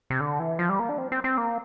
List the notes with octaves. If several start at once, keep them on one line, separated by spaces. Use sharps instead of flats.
C3
D3
E3
F3
G3
A#3
D4
C4
C4
C4
A#3